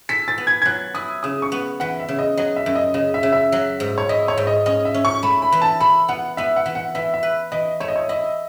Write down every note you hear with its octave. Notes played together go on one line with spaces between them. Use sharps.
A4 B6
A6
B3
G#6
G#6
F#3 F#6
E4 D#6
C#3 D#6
C#6
B3
E3 F#5
E5
C#3
D#5
F#3 D#5
E5
F#2
D#5
C#3 D#5
E5
C#3
E5
F#3
G#2
C#5
E4 D#5
C#5
G#2
D#5
C#4 D#5
E5
C#4
C#6
A3 B5
B5
E3
A5
A4 B5
B3 F#5
B3 E5
F#5
E3
F#5
E3 E5
E5
B4
E3 D#5
A3 C#5
D#5
C#5
E4 D#5